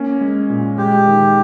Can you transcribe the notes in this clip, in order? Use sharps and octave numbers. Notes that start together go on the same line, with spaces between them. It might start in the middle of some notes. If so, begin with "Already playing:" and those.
Already playing: A#3 C#4
G#3
A#2
G#3 G4
D#3